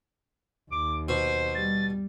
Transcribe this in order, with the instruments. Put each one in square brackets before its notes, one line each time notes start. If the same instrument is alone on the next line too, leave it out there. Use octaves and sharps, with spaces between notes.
[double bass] D#2 [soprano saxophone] D6
[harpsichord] B2 [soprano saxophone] C5
[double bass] G3 [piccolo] A6